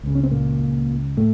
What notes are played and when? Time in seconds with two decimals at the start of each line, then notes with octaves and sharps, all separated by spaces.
0.03 C#2 C#3
0.15 C#4
0.23 C4
0.31 A#2 A#3
1.17 A2 A3